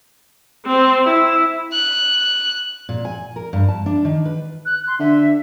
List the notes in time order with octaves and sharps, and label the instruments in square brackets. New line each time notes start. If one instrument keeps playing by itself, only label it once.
[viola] C4
E4
[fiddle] F#6
[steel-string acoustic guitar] A#2
G#5
A#4
G2
A5
D4
D#3
B4
[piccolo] F#6
C6
[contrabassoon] D3 [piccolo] E5